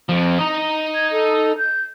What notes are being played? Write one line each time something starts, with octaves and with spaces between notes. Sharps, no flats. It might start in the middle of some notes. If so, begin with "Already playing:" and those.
F2 F3
D#4 D#5 A#5
G#6
A4
G6